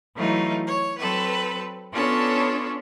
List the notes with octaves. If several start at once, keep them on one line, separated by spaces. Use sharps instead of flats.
E3 F#3 A3 D#4 F4
C#5
F#3 C4 A4 B4
B3 C#4 D4 F4 A4 C#5